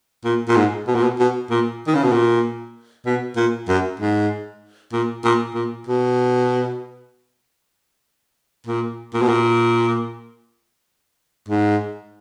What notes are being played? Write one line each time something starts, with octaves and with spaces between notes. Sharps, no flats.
A#2
A#2
G#2
B2
A#2
B2
B2
A#2
D#3
C#3
B2
A#2
B2
A#2
F#2
G#2
A#2
A#2
A#2
B2
A#2
A#2
B2
A#2
G#2